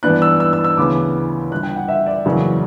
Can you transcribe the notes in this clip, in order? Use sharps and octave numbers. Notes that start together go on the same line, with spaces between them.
G2 E3 B3 D4 F#6
E6
E6
E6
E6
D2 C#3 E3 B3 D6
G1 G2 D3 F#6
G5
F#5
E5
D5
F#1 E2 C#3 F#3